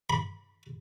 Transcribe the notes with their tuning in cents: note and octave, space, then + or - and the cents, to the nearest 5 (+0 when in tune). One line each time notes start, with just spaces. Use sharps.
B5 -15